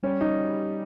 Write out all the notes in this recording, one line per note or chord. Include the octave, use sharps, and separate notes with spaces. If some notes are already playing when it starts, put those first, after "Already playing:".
G3 C#4
D#4